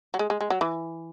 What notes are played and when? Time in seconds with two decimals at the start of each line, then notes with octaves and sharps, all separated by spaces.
0.14 F#3
0.19 G#3
0.30 G#3
0.41 G#3
0.50 F#3
0.61 E3